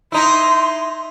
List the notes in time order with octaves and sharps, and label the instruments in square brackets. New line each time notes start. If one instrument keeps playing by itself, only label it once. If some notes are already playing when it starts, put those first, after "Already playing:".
[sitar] D#4 E4 [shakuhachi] C6